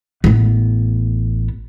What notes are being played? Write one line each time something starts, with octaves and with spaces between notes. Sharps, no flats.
A1 B3